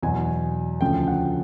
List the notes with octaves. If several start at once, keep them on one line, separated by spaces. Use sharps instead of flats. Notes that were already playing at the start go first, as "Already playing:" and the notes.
E2 B2 F#3 G#5
D2 C#3 F3 A3 C#4 G5
F#5